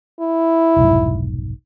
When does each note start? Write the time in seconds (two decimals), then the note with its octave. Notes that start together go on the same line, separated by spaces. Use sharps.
0.20 E4
0.77 F1 B1 G#2